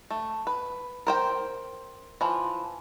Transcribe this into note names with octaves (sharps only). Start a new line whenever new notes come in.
A3
B4
A#4 C5 G5
E3 F3